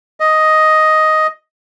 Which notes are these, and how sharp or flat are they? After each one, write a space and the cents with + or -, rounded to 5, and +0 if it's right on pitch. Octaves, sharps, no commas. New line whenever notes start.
D#5 +5